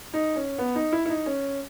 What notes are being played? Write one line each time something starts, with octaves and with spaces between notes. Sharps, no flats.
D#4
C#4
B3
D#4
E4
E4
D#4
C#4